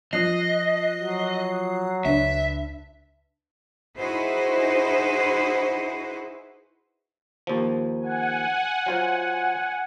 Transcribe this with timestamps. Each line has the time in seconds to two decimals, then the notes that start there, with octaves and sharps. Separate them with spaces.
0.13 F3 D#5 D#6 F#6 C7
0.99 F#3
2.05 C#2 D4 B4 E5
3.98 D#4 E4 F#4 G#4 B4 C5
7.47 D#2 F3
8.00 F#5 G#5
8.86 F#3 F4 C5